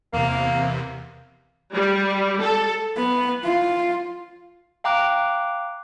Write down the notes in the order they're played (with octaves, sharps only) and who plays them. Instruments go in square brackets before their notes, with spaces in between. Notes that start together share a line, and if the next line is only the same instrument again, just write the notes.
[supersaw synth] E2 C3 [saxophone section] A#3
[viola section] G3
A4
[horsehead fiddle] B3
F4
[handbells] F5 G5 A#5 D6 F#6